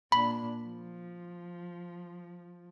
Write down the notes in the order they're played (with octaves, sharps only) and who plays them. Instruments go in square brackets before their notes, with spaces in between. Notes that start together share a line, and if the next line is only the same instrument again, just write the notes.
[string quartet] A#2 D4 [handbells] B5
[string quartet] F3